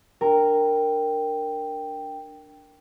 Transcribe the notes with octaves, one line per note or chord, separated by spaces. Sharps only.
D4 A#4 G5